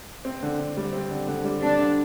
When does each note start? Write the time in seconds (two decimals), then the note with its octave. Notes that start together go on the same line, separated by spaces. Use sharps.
0.25 C4
0.42 D3
0.60 D3
0.77 G3
0.93 C4
1.10 D3
1.28 D3
1.44 G3
1.62 C4 D4
1.78 D3